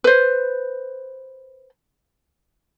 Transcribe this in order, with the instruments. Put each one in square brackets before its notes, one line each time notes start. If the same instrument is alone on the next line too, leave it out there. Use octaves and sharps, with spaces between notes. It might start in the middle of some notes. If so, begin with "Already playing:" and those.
[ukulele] B4 C5